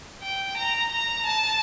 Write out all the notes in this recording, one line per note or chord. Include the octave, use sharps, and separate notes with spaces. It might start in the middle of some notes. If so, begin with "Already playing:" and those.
G5
A#5
A#5
A5